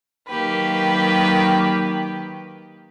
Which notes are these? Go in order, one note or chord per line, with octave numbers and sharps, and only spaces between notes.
D#3 F#3 A#3 G4 B4